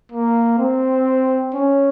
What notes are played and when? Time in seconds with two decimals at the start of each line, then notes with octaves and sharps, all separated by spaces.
0.12 A#3
0.58 C4
1.54 C#4